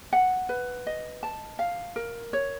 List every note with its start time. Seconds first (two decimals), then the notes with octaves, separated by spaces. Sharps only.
0.13 F#5
0.49 B4
0.87 D#5
1.23 A5
1.59 F5
1.96 A#4
2.33 C#5